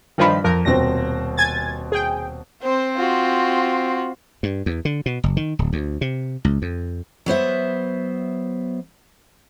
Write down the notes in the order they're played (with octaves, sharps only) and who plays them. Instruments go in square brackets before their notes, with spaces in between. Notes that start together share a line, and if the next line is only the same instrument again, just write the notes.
[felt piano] G2 B5 [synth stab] D#3 F3
[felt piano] F2 [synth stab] A#4
[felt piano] D#1 B2 C4 [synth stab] A#6
[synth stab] G#5 G#6 A6
G#4 G5
[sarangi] C4 [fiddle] C5
[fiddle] F4 F#4
[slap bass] G2
E2
D3
B2
F#1
D#3
D1
D2
C3
C#2
F2
[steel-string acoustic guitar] F#3 B3 C5 E5